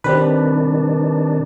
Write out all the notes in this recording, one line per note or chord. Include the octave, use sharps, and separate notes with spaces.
C3 D#3 G3 C4 D4 B4